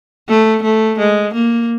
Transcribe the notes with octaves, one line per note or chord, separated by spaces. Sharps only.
A3
A3
G#3
A#3